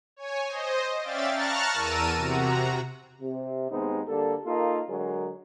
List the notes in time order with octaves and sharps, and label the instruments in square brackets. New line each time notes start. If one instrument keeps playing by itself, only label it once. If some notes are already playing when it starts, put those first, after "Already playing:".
[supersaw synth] C#5 G#5
C5 D#5
C#4 D5 E5 F5 G5 A6
A5 A#5 C#6 F6 F#6 A6
E2 A#4 A5 E6 D#7
C3 F#4 A#5
[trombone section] C3
D#2 G#3 B3 C4 D#4
D3 G3 A#3 A4
A#3 D#4 F4 A4 A#4
D3 F#3 G#3 G#4 A#4